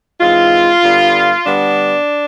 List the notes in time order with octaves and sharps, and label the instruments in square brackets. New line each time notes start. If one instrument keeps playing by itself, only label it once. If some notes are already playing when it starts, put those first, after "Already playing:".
[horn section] G#2 E3 G#3 C4 F4
D3 G3 B3
D3 G3 B3 D4